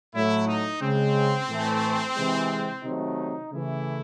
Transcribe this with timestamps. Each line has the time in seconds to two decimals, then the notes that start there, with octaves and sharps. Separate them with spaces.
0.14 A2 F#3 A3 E4
0.48 D#4
0.82 C#3 G#3 C4
1.49 A2 E3 A3
2.16 C3 E3 G#3
2.84 C3 D#3 F#3 A3 D#4
3.51 C#3 E3 A3 E4